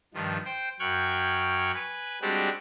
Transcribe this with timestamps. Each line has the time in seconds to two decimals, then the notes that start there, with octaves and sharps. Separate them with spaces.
0.14 G2 D#3 F3
0.45 C5 G5
0.80 F#2 G5 C#6 F6 F#6 G#6
1.74 B4 G#5
2.22 G3 G#3 C4 D4 F#4 G4